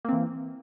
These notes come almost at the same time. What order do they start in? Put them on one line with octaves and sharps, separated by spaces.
A#3 C4 E3